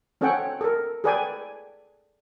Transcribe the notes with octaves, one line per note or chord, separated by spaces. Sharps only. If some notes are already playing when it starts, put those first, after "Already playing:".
C4 C#4 A4 C#5 F#5 G5
A4 A#4
G#4 A4 B4 D5 G5 G#5